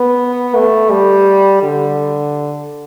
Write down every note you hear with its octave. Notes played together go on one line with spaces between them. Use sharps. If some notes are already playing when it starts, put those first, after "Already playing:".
Already playing: B3
A3
G3
D3